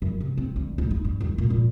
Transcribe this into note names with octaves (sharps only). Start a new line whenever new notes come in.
F#2
C3
C4
D2
D1
D#4
G2
D#2
A#2
A#2